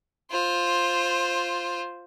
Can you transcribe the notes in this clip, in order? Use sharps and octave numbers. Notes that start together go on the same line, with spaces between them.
F4 C5